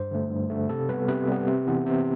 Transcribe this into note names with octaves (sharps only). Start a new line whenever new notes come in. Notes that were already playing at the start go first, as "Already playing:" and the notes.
Already playing: G2 C5
D3 A3
G2
D3 A3
C3 A4
G3 B3 B4
C3 B4
G3 B3
C3
E3 B3
C3